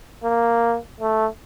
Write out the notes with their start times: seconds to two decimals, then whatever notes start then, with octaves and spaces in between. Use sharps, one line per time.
0.24 A#3
1.00 A3